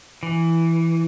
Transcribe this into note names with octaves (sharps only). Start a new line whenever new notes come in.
E3